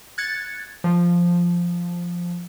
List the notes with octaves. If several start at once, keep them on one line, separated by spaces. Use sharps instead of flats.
F#6 G#6 A6 C#7
F3